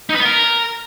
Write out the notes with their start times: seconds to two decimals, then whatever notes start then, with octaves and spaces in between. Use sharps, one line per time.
0.09 D#4
0.15 B4
0.20 B3
0.25 A#4